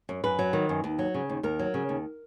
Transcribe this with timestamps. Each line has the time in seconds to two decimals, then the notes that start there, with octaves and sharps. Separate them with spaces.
0.09 F#2
0.24 F#2 B4
0.39 F#3
0.53 D#3
0.69 F#2
0.84 D#2
0.99 F#3
1.14 C#3
1.30 D#2
1.43 D#2 A#4
1.59 F#3
1.74 C#3
1.89 D#2